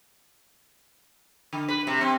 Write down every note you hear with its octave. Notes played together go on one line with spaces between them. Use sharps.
D3
B4
C3
C4